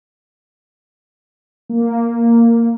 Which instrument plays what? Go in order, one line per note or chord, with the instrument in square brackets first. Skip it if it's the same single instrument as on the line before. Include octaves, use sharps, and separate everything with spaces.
[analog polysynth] A#3